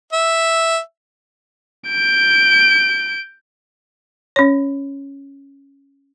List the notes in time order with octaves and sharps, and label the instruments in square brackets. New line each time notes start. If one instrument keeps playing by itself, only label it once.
[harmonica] E5
[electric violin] G6 D7
[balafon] C#4 C#5